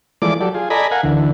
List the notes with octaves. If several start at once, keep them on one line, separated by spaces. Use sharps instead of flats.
E3 F3 G#3 A3 D5 D6
F#3 G4 A4 D5
F4 G#4
A4 D5 D#5 G#5 A#5 B5
A#4 F5 F#5 G#5
D2 D3 E3